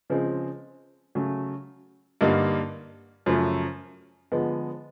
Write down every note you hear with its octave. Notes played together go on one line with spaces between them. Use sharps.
C#3 F3 G#3 C4
C#3 F#3 A3
G2 D3 G3 A#3 D#4
F#2 C#3 F3 A3
D3 F3 G#3 B3